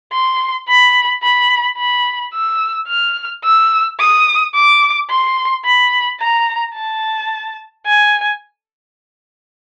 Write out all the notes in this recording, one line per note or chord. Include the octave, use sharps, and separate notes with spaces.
C6
B5
B5
B5
E6
F6
E6
D#6
D6
C6
B5
A#5
A5
G#5